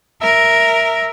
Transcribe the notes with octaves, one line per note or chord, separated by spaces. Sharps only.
A#4 E5